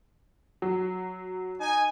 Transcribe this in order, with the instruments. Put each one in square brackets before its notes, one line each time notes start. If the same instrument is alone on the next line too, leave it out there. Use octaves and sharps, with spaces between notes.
[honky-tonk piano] F#3
[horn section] D#4 G#5